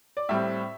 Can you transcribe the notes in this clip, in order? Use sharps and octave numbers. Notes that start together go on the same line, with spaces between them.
D5
A2 G3 C4 E5